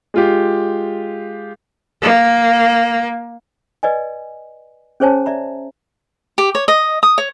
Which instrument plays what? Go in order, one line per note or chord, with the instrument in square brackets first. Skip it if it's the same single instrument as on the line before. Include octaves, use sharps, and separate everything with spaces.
[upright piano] G#3 F4 G4
[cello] A#3
[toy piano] B4 D5 D#5 G#5
C#4 G#4 C5 C#5 G#5 A5
D5 E5 A#5
[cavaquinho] G4
C#5
D#5
D#6
C#5